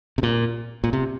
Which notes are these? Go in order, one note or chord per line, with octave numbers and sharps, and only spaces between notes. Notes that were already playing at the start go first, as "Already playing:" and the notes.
C3
A#2
A#2
C3